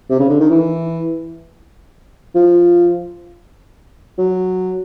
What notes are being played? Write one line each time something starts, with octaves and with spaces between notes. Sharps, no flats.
C3
C#3
D3
D#3
E3
F3
F#3